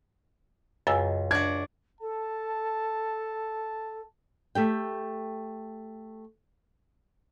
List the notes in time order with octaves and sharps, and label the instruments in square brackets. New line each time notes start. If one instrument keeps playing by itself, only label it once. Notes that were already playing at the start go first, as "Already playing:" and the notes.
[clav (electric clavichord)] C#2 [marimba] F#2 G#5 E6
[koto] D4 F#4 [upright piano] G#6
[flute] A4 [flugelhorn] A5
[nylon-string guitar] A3 G4 G5